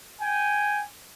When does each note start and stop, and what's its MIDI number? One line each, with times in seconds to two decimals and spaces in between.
0.21 0.80 79
0.21 0.80 80